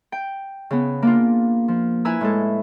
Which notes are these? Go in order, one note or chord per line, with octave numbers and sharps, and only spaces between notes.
G5
C#3 B3
A#3 D4 F4
F3
E4 B4 G#5 A#5 E6
A2 G#3 A4